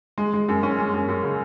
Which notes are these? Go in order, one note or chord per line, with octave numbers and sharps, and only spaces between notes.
G#3
G#3
F#2
C#4
G#3
F#2
F#2
C#3